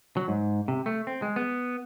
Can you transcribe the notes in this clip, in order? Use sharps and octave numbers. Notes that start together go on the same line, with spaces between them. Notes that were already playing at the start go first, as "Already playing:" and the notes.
F#3
G#2
C3
A3
C4
G#3
B3